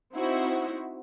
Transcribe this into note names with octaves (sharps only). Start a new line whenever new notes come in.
C4 D#4 E4 F#4 C5